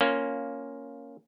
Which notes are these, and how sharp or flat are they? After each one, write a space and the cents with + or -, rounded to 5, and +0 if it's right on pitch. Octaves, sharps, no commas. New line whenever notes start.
A#3 +0 C#4 +0 F4 +0